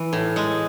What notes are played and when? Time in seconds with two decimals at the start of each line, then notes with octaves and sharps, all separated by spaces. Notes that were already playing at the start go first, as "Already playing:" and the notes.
Already playing: E3
0.13 A2
0.36 G#3